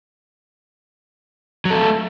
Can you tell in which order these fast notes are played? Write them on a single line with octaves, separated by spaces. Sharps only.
F#3 A4 A3